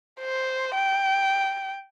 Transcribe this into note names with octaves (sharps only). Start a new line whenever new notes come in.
C5
G5